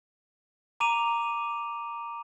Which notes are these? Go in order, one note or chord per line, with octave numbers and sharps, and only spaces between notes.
A#5 D6 D#7 F7